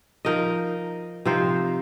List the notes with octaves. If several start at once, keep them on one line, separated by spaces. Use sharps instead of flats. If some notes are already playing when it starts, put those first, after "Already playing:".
F3 D#4 A#4 D#5
C3 F3 D#4 C5